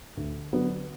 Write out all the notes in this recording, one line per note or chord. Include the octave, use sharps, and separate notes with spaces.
D2
D3 F#3 B3